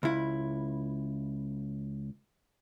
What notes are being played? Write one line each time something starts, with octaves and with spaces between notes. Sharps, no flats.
C#2 E4